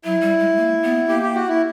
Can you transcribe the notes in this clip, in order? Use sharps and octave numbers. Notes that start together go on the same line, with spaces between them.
F#3 E4
G3
G#3
A#3
B3
A#3 G4
G4
F#4
E4